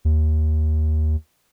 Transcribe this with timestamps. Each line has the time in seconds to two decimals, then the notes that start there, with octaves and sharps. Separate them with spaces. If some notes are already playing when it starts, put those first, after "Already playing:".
0.05 D#2